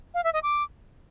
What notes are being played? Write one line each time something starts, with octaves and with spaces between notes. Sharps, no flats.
F5
E5
D#5
D6